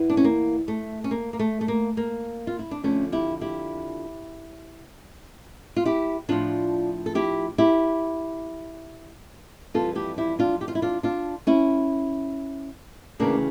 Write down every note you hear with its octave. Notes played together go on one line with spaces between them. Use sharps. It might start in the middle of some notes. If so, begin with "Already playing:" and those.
Already playing: E2 E3
D4
C#4
A#3
A3
C#4
A#3
A#3
A3
A3
A#3
A#3
F4
E4
D4
F2 D3 F3 A3 C#4
E4 G4
E4 G4
F4
E4 G4
A2 F3 D4 F4
A4
E4 G4
E4 G4
F2 E3 G3 F4 A4
E4 G4
E4 G4
D4 F4
G4
F4
E4
D4 F4
D4 F4
C#4 E4
D2 C#3 E3 A#3 D4